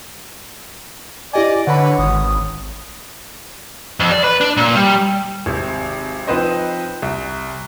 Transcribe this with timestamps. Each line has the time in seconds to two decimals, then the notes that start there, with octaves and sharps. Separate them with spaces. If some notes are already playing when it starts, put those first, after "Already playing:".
1.34 E4 G4 D5 D#5 G#5
1.67 D3 B4 C#5 F#5 B5
1.98 G#1 D#6
4.00 F2
4.12 D5
4.24 B4
4.41 D4
4.57 A#2
4.76 G3
5.46 G#1 C3
6.27 F3 C4 D#4 B4 C5 D#5
7.02 C2